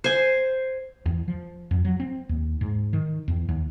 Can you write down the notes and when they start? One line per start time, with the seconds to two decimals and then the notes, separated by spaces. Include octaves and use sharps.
0.04 C5 G#5
1.06 E2
1.28 F3
1.71 F2
1.85 F#3
2.00 C4
2.29 D#2
2.61 G#2
2.93 D#3
3.28 E2
3.49 D#2